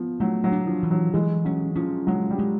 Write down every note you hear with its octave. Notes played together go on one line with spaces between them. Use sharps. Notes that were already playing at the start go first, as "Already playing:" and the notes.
Already playing: F3 B3
F#3 A3
F#3
D4
F3
E3
F#3
E3 G#3
F#3 C#4
F3 C#4
F#3 G#3
G3
G#3